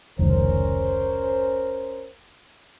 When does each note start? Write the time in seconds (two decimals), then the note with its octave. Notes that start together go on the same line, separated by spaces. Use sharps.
0.19 F1 C#2 D#3 C#4 A#4 C5